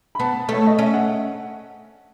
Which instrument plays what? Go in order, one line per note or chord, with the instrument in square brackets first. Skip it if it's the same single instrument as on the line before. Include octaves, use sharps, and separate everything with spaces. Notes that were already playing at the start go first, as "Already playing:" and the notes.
[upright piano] B5
[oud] B3 [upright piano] A5
[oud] A3 [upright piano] C#5
[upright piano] D#5
[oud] C#4 [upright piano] E5
[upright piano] F#5